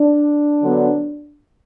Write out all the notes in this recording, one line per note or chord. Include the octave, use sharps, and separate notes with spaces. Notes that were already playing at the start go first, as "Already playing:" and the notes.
Already playing: D4
D3 F#3 B3